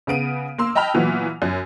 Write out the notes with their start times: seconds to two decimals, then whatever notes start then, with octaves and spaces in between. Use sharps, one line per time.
0.07 C#3 B3 D7 D#7
0.58 A#3 C6 E6
0.75 D#5 G5 A5 B5 F6
0.94 A#2 E3 F#3 B3
1.42 F#2